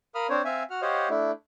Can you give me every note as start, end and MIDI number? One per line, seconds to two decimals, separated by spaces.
0.15 0.27 70
0.15 0.27 77
0.15 0.27 83
0.15 0.27 87
0.15 0.27 89
0.29 0.42 60
0.29 0.42 62
0.29 0.42 72
0.29 0.42 73
0.45 0.63 60
0.45 0.63 76
0.45 0.63 77
0.45 0.63 80
0.70 0.82 66
0.70 0.82 78
0.70 0.82 89
0.82 1.09 67
0.82 1.09 72
0.82 1.09 73
0.82 1.09 75
0.82 1.09 77
0.82 1.09 78
1.10 1.31 57
1.10 1.31 62
1.10 1.31 64